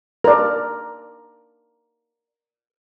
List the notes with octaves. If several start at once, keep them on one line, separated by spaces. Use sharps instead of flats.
A#4 D5